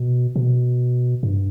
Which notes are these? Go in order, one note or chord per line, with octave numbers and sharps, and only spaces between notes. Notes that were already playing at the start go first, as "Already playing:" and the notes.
Already playing: B2
B2
G2